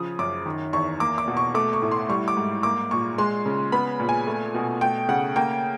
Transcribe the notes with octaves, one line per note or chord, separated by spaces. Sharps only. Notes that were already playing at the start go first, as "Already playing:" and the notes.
Already playing: C#3 F3 D#6
F#2 D6
D#3
E2 C#6
A#3 D6
D6
B2
C#6
A3 D6
C#6
A2
C6
G3 C#6
D6
G#2
A#3 D6
A#2 C#6
G#3 C6
C#3
B3 B5
A#2
G#5
A3
B2
A3 G5
C#3 F#5
A#3 G5